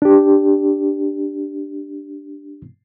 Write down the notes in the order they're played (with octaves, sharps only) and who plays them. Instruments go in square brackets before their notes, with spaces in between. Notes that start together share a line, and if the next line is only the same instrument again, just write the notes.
[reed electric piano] D4 G4